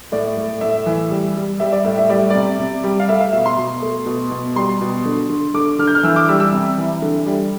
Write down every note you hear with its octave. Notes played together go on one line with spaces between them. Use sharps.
A2 D5
A2
A2 E5
E3
G3
G3
G3 E5
D5
A2 E5
E5
G3 D5
C3 D5
C3
G3
F5
A3 E5
F5
B2 E5
C6
B2
A3
B2
B2
G3 C6
B2
D3
D3
D3 D6
D3 F6
G6
F6
E3 E6
D6
G3 E6
E6
C3
E3
D3
G3